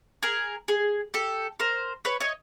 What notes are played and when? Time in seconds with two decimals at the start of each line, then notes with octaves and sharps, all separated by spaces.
0.23 G#4 A#4
0.68 G#4
1.14 G4 A4
1.60 A#4 C5
2.05 B4 C#5
2.20 C#5 D#5